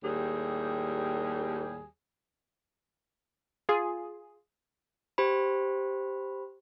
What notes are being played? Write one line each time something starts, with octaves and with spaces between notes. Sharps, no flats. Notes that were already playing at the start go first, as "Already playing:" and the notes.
D#2 A2 G3 G4 G#4
F4 G#4
G4 C5 B5